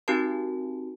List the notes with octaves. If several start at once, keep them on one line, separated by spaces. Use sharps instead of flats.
C4 D#4 F#4 G4 A#4 A5